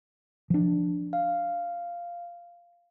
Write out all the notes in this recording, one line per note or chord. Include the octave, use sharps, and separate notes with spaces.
F3 D4
F5